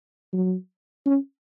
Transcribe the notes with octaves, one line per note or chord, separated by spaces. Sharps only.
F#3
C#4